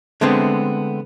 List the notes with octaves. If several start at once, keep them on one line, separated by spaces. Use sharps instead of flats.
D3 G#3 A3 B3 C4